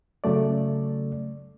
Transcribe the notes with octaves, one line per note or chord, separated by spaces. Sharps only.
C#3 F#3 A3 D5